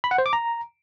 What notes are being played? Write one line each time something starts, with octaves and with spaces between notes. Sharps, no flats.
B5
F#5
C5
D6
A#5